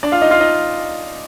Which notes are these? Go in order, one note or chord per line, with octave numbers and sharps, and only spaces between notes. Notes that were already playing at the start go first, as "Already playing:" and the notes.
D4 D5
F4 F5
D#4 D#5
F4 F5
D#4 D#5